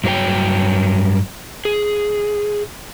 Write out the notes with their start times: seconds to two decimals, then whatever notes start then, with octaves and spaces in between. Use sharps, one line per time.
0.04 G2 F#3 D#4 C#5 G5
1.65 G#4